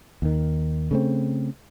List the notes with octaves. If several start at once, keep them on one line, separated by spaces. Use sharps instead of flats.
D#2 D#3
C#3 A3 C4